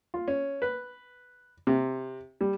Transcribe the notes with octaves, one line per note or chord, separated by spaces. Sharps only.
F4
C#4
B4
C3
G3